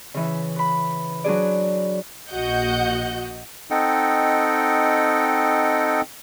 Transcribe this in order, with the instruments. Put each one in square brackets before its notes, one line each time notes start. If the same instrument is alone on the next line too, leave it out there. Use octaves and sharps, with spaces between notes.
[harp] C#3 E3 E5
B4 B5
F#3 D4 G#4 D5
[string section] A#1 F#4 D#5 F#5 G6
[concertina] C4 D#4 A4 D#5 F#5 G5